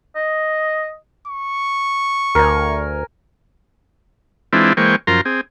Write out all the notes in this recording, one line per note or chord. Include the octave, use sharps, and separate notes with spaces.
D#5
C#6
D2 A#4 G#5
E3 G#3 C4 D4 E4 F4
E3 G#3 A#3 C5 G5 C#6
F#2 F3 F4 A#4 A#5 C6
C4 G#4